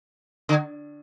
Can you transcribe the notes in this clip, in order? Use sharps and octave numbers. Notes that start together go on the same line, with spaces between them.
D3